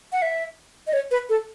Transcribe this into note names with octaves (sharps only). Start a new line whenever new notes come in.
F#5
E5
D#5
C#5
B4
A4